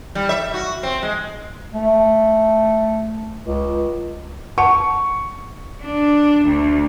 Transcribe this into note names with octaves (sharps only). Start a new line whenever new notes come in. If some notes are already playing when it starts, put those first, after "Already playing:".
G3
E5
F#4
C4
G#3
A3
C#2
F#5 A5 C#6
D4
D2